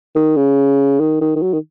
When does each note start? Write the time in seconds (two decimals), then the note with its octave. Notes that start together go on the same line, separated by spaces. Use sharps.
0.15 D#3
0.36 C#3
1.00 D#3
1.21 D#3
1.36 D#3
1.42 F#3
1.53 D#3